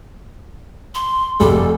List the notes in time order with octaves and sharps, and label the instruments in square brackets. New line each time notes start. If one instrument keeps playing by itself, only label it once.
[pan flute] C6
[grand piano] F1 G3 G#3 [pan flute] A4